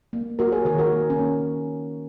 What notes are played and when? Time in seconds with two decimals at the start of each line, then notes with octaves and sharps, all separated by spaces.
0.13 A#3
0.39 A#3 F#4 A#4
0.52 G#4 C#5
0.65 D#3 G#4 C#5
0.78 F#4 A#4
0.93 A#3
1.10 C#4
1.19 A#3